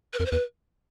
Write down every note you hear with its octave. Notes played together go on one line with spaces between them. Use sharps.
B4
F2 A#4
C5
E2 B4